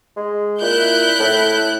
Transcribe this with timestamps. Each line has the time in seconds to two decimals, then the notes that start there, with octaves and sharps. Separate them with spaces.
0.17 G#3
0.61 A#2 E4 F#6 G6
1.19 A2